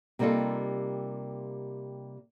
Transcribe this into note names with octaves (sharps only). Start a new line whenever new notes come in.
C3 G3 A#3 D#4 F4 A4